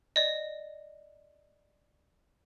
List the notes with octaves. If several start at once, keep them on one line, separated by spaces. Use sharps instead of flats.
D5 D#5